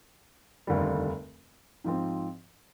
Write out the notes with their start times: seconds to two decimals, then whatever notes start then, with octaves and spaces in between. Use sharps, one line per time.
0.67 F1 D#2 D3 G3
1.84 G#2 F3 C4